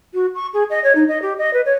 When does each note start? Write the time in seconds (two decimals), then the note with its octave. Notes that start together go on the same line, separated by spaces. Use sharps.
0.13 F#4
0.34 C#6
0.53 G#4
0.70 D#5
0.83 C#5
0.95 D#4
1.08 D#5
1.22 G4
1.38 D#5
1.53 B4
1.65 C#5